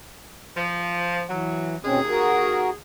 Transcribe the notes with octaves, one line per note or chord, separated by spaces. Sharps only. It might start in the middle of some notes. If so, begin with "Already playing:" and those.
F3
E3 F#3
D#2 B2 C4 C#4 G#4
F#4 A#4